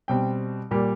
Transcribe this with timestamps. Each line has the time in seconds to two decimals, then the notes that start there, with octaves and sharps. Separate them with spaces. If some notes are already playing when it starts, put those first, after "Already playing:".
0.08 B2 G3 C4 G5
0.71 A#2 G3 A#3